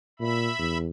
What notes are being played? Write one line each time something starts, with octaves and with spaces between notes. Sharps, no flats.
A#2 E5 B5
E2